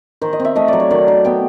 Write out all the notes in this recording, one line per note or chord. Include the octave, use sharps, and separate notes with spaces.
D#3 C5
D#5
C4
E5
A3 D#5
F#3 D5
C#5
D#3 D5
D#3
B3 G5